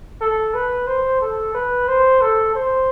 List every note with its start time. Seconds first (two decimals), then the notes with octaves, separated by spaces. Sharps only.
0.21 A4
0.54 B4
0.87 C5
1.21 A4
1.55 B4
1.88 C5
2.22 A4
2.55 C5